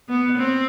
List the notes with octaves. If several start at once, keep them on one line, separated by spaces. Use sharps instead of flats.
B3
C4